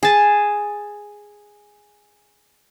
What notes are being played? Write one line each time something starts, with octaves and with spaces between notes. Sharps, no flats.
G#4 A5